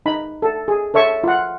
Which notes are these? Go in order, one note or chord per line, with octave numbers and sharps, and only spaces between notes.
D#4 B5
A4
G#4
A4 C#5 E5 C#6
F4 F#5